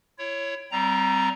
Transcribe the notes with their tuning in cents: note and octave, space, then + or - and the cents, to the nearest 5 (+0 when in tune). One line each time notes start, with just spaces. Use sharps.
E4 +35 C#5 +0
G3 -25 C4 -15 A#5 +0